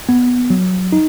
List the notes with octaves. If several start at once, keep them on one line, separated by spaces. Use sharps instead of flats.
B3
F#3
D#4